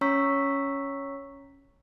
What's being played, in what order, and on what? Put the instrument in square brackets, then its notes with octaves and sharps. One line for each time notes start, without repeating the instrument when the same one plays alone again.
[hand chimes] C#4 C#5 A#5 C#6 E6 B6